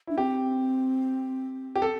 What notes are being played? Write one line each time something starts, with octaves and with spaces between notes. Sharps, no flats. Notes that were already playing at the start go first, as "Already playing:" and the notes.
D4 E4
C4 G4
G4
A4